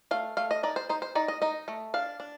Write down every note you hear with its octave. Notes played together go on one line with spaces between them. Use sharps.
A3 F5
A3 F5
D#5
D#4 D5
C5
D#4 C5
C5
D#4 D5
D#5
D#4 D#5
A3
D4 F5
D4